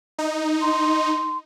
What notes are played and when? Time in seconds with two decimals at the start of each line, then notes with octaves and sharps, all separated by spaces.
0.18 D#4
0.61 C6